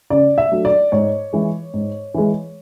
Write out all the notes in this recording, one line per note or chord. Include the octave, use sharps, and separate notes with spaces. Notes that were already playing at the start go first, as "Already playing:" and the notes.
C#3 D5
E5
F#3 A3 D4
D5
G#2 C#5
E3 G#3
G#2
E3 G#3